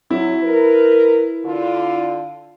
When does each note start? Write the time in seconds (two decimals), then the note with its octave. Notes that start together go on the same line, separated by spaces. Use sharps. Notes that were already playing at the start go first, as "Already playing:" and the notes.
0.11 F#3 E4
0.44 A#4 B4
1.45 D3 F4